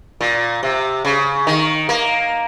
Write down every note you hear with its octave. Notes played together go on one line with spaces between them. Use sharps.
A#2
C3
C#3
D#3
A#3